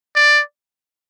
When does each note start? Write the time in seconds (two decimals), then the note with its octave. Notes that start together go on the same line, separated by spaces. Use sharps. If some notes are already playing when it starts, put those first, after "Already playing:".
0.15 D5